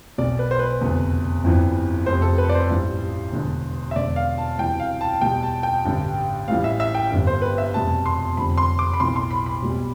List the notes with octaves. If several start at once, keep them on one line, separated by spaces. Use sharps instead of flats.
B1 B2 A3 D5
B4
C5
B4
F1 E2 D3 A3
G1 F2 E3
F1 F2 C3 C5
A4
B4
D5
C5
A1 G2 E3 G3
E1 E2 D3
E5
E1 E2 D3 D5
F5
A5
D2 C3 E3 G3 G5
F5
A5
E2 B2 G3 G5
A5
G5
A1 G2 D3
A1 A2 E3 G3 F5
E5
E5
G5
G1 G2 D3 A3
C5
B4
E5
F1 E2 B2 G3 A5
C6
F1 F2 D3 G3 B5
C6
D6
B5
B1 A2 E3 A3 C6
C6
B5
B5
B1 B2 G3